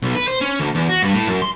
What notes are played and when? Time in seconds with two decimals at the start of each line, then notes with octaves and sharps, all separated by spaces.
0.02 B1
0.15 B4
0.28 C5
0.41 C#4
0.60 D2
0.75 E2
0.89 F#4
1.02 G2
1.14 A2
1.27 F#2
1.42 C6